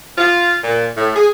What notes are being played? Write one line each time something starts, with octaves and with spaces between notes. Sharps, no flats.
F4
A#2
A2
G#4